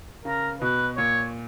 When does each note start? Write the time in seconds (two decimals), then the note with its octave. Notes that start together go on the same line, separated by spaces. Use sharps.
0.25 C#3 A#4
0.61 B2 B4
0.97 A#2 C#5